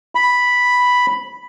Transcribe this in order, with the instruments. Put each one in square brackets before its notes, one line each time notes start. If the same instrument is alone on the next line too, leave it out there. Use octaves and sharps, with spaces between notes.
[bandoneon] B5